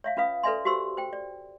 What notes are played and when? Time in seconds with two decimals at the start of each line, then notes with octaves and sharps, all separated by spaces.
0.04 C#5 E5 F5
0.17 C#4 F4 B4 F5 D#6
0.43 A4 B4 D5 E5 G#5 C6
0.65 F#4 G4 C5 C6 E6
0.97 C5 G5
1.13 D5